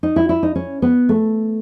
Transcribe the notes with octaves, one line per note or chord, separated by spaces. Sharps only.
D#4
E4
E4
D#4
C#4
B3
A3